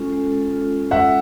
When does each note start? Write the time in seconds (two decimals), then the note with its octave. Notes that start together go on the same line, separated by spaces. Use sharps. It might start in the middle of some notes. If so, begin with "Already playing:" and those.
Already playing: G#3 C#4 F4 A4
0.13 G#3
0.32 A4
0.52 F4
0.71 C#4
0.91 G#3 E5 F#5